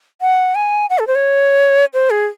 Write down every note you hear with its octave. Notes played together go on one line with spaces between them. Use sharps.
F#5
G#5
F#5
A4
C5
C#5
C5
G#4